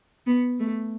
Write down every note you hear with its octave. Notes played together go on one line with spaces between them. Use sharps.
B3
A3